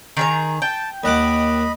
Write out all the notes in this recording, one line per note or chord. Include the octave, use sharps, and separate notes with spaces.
D#3 G#4 A#5
G5 A5
D#2 D#5 F#5 B5 D6